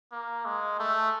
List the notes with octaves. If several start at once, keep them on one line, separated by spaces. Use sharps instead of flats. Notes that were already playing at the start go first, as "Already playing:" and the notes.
A#3
G#3
A3